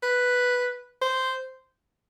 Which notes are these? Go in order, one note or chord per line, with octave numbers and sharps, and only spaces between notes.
B4
C5